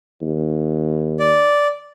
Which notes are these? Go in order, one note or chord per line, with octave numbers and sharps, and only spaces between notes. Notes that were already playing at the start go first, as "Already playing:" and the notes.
D#2
D5